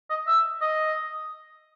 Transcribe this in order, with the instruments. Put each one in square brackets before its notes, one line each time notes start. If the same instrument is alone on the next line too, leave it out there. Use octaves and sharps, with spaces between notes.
[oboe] D#5
E5
D#5